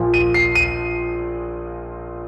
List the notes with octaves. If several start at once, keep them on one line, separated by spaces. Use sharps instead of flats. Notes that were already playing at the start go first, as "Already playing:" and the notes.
Already playing: A#1 A#2 F3
D#7
C7
D#7